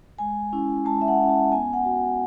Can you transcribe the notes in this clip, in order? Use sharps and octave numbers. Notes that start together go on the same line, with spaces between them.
G#3 G#5
C#4 E4
G#3 A5
E5
F#5
C#4 E4
A5
B3 G#5
F#5
F#4